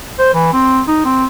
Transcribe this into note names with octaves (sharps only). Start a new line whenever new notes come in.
C5
E3
C4
D#4
C4